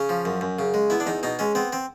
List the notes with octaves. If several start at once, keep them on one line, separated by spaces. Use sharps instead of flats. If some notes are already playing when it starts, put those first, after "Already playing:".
Already playing: C#3 C#4
F3
F#2
F#2
C#3
G#3
B3 E4
D4
E2 D#4
B2 D#4
G#3 C#4
B3 C4
C4